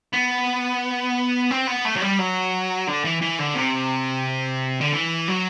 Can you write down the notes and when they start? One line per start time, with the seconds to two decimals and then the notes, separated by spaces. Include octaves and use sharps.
0.13 B3
1.51 C4
1.67 B3
1.85 A3
1.96 F#3
2.02 G3
2.19 F#3
2.87 D3
3.04 E3
3.22 E3
3.39 D3
3.55 C3
4.81 D3
4.93 E3
5.28 F#3